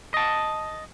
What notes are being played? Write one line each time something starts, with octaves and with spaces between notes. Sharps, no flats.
D#5 A5